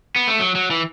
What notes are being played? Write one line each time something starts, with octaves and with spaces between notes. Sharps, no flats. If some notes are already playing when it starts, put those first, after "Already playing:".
B3
A3
F#3
F#3
E3